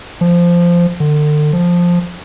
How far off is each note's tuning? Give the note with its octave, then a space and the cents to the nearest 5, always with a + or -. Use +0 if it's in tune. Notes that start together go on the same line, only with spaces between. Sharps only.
F3 -10
D3 +35
F3 +5